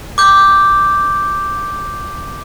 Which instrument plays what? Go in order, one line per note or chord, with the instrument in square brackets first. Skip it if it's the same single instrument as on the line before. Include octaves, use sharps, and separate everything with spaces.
[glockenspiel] D6 G6